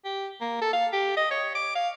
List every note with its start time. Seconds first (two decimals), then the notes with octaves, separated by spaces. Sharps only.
0.05 G4
0.41 A#3
0.62 A4
0.73 F5
0.93 G4
1.17 D#5
1.31 C#5
1.55 D6
1.75 F5